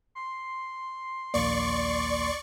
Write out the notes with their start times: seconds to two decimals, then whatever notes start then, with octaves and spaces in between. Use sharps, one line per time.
0.15 C6
1.34 A#1 D#2 A#3 D5 C#6